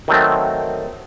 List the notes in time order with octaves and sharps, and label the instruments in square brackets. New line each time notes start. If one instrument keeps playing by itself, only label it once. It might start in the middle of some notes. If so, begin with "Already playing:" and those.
[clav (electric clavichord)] D#3 F#3 A3 C4